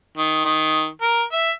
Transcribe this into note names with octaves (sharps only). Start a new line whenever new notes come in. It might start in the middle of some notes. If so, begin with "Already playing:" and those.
D#3
D#3
A#4
E5